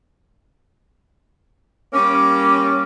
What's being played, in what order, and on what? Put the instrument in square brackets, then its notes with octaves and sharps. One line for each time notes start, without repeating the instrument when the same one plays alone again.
[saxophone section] G3 A#3 C#4 [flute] D6